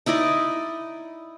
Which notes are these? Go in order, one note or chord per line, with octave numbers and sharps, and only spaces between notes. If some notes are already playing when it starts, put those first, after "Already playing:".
D#4 E4 D5 D#5